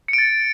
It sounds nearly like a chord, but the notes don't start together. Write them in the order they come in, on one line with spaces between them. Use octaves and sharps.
C#7 D7 A6